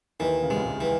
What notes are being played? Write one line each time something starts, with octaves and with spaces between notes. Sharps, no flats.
D#2 D#3 E3
C#3
C3 G#3
C#2 C#3
C3
E3